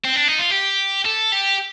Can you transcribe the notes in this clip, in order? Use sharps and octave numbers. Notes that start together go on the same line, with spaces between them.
C4
D4
D#4
F4
G4
A4
G4